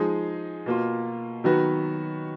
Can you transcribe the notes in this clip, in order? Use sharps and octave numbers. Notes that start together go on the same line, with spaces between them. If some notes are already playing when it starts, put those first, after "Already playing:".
Already playing: F3 G#3 D#4 G#4
B2 A#3 F4
D#3 F#3 B3 F#4 B4